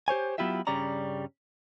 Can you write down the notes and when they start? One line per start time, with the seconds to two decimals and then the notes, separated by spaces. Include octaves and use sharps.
0.08 G4 C5 C#5 G#5
0.38 F#3 B3 E4 F4 G4 E5
0.67 G2 C#3 G3 C#4 D5 A#5